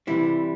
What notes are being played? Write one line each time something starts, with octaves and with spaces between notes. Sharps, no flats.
C3 E3 G3 E4